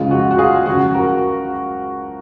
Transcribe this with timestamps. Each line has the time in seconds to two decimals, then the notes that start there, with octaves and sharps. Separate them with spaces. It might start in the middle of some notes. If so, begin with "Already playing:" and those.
Already playing: C#2 C#3 F3 G#3 F4
0.11 F#4
0.31 F#4
0.38 F4 G#4
0.66 C#2 C#3 F3 F#4
0.94 F#4 A#4